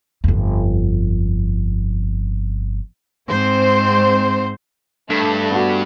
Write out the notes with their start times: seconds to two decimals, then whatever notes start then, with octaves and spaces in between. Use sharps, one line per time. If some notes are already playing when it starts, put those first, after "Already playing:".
0.24 G1 F2
3.29 G#2 C4 C5
5.10 G2 A3
5.51 B3 F#4